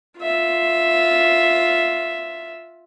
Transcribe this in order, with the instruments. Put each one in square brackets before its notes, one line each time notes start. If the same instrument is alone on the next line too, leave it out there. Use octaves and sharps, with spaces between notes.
[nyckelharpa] F4 E5